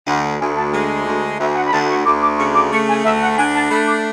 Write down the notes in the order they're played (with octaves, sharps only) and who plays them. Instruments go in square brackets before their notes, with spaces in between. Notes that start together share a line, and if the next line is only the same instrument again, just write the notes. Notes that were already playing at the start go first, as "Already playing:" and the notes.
[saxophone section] D2 [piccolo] F#5
[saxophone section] D2 [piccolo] G#5
[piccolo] A5
[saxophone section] G#3
D2
[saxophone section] D2 [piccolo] E5
[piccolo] G#5
F#5
B5
[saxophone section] D2 [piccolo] A5
[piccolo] C#6
[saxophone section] D2 [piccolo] D6
[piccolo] D6
[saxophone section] C#3 [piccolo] C#6
[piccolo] D6
[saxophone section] A3 [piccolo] C#6
[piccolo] G#5
[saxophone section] D2 [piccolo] E5
[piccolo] F#5
[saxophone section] D4 [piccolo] G#5
[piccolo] A5
[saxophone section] A3 [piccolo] B5
[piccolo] D6